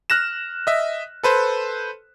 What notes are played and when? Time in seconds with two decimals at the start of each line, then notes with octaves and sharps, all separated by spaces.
0.10 F6 F#6 A#6 E7
0.67 D#5 E5
1.23 A4 B4 C5